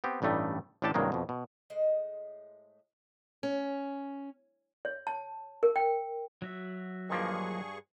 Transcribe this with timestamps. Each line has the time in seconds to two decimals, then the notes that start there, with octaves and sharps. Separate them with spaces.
0.04 B3 C4 G4
0.22 A1 G2 G3 A3 D#4 E4
0.82 A1 A2 D4 G4 A4 A5
0.94 C2 G2 D#3 F#3 G#3 A#3
1.12 F2 B2
1.29 B2
1.70 A2 G#3 C5 D#5
3.43 C#4
4.85 C#5
5.07 A5
5.63 A#4
5.76 G5
6.42 F#3 F#4 E5
7.10 G2 D#3 F3 A#3 G#4 C#6